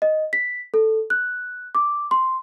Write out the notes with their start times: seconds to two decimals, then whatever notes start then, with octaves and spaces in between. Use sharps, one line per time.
0.02 D#5
0.33 B6
0.74 A4
1.10 F#6
1.75 D6
2.11 C6